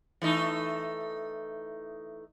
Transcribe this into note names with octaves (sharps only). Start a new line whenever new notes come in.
E3 A3 D#4